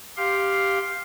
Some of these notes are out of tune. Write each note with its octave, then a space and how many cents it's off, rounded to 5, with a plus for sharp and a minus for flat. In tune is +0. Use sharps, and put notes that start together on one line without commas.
G4 +0 F5 +0 C6 +0